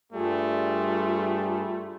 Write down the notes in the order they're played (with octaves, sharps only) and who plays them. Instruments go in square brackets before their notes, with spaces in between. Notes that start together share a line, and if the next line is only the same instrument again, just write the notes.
[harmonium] G2 G#4 [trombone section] G3 [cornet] A3 [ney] F4